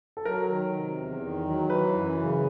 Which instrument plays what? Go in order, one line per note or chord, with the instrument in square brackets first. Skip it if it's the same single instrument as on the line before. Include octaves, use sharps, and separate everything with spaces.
[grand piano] A4
[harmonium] F#3 [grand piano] A#4
[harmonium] D#3
C3
E2
D#3
F#3
[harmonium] E3 [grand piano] B4
[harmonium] F#2
C#3